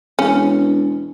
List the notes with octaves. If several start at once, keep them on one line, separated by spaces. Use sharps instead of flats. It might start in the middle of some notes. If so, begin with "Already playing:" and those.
E1 C#4